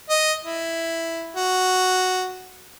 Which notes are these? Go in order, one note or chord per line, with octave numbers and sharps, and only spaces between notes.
D#5
E4
F#4